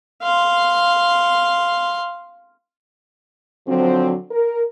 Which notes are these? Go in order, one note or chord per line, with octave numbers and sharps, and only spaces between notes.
F5 C6
D3 F3 F#3 C4
A#4